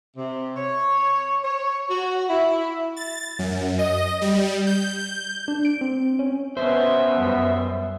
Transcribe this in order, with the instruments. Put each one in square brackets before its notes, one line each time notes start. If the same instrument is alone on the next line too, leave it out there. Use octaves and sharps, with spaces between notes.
[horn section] C3
C#5
C#5
F#4
E4
[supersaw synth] A6
F#2
D#5
G3
G6
G6
[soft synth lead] D4
D7
C4
C#4
[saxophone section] B2 E5 [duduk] B3 [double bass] C#4 [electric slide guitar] C5
[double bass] F#2 G3